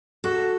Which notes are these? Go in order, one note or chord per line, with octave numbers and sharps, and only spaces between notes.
F#4 A4